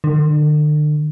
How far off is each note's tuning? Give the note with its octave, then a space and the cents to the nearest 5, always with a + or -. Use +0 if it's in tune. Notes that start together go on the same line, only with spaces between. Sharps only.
D3 +40